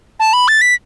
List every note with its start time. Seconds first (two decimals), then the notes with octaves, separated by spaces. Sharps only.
0.20 A5
0.33 B5
0.48 A6
0.61 B6